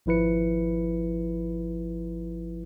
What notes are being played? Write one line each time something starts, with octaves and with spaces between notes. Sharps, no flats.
G#1 F3 E4 B4 C#7